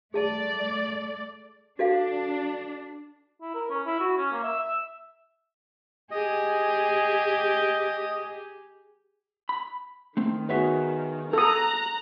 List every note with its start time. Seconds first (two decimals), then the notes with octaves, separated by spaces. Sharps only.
0.14 A3 G#4 D5 A5
1.79 D4 F#4 A4 F5
3.42 E4
3.55 A#4
3.70 C#4
3.86 E4
4.00 F#4
4.17 C#4
4.32 A#3
4.43 E5
4.59 E5
6.11 G4 G#4 D#5
9.49 B5
10.17 D#3 A3 C4
10.49 B3 F#4 G#4 B4 C#5 E5
11.33 A4 A#5 D#6 F#6